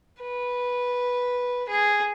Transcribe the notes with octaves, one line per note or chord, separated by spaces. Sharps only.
B4
G#4